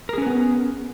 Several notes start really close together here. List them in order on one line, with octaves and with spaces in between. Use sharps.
A#4 G#4 C#4 B4 B3